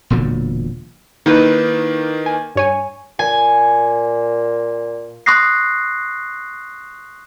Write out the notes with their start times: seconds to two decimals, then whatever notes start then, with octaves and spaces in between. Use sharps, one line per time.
0.10 E1 A#2 D3 F#3
1.26 D#3 A#3 D#4 E4 B4
2.26 G#5
2.56 G2 C#5 G#5
3.19 A#2 G#5
5.26 C6 C#6 D#6 F#6 A#6 C7